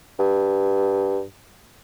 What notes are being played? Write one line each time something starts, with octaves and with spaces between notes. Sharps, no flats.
G2